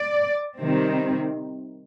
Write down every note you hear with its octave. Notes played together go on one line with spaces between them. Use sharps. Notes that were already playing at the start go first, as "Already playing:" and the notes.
Already playing: D5
C3 D#3 G3 C4